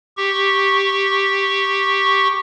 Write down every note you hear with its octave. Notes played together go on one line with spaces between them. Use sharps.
G4 C#6